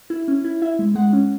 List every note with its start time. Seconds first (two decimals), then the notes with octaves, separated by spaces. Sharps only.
0.10 E4
0.28 C#4
0.45 E4
0.62 E4 E5
0.79 G#3
0.95 G#3 F#5
1.13 C#4